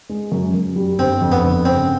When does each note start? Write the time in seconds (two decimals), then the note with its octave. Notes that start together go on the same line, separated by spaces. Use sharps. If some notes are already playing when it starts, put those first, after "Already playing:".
0.09 G#3
0.32 F#2
0.54 F#2
0.76 G3
0.98 G1 C4
1.21 F2
1.32 B3
1.44 G1
1.65 C#3 C4